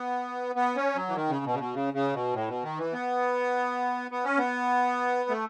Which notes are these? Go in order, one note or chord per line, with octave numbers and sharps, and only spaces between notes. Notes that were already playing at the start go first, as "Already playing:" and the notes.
Already playing: B3
B3
C#4
F#3
E3
D#3
C#3
B2
C#3
B2
C#3
C#3
B2
A2
B2
D#3
E3
B3
B3
C#4
B3
A3